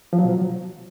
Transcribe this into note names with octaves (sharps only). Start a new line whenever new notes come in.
F3
F#3
B2
F#3